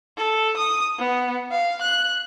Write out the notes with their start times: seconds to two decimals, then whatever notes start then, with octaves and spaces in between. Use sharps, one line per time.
0.18 A4
0.57 D#6
0.99 B3
1.51 F5
1.82 F#6